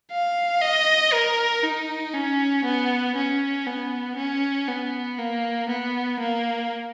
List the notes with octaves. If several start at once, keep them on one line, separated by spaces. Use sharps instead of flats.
F5
D#5
A#4
D#4
C#4
B3
C#4
B3
C#4
B3
A#3
B3
A#3